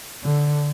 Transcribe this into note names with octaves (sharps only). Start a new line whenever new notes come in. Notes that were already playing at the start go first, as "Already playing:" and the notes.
D3